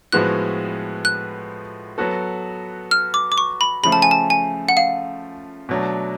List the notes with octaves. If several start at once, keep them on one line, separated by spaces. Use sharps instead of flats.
A2 F3 G#3 B3 F#4 F#6
F#6
F#3 B3 F#4 A4
F6
D6
D6
C#6
B5
C#3 F3 A3 B5
A5
G#5
A5
G#5
F#5
F5
B2 F#3 A3 D4